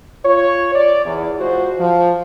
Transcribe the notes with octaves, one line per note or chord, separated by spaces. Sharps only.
F4 C#5
D5
E2
G#3 F4 F#4 C5
F3